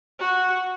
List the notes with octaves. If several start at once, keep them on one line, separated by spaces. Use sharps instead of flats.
F#4